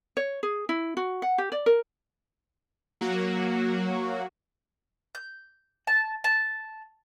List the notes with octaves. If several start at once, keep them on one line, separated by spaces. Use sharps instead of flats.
C#5
G#4
E4
F#4
F#5
G4
D5
A#4
F#3 A#3 F#4
G6
A5
A5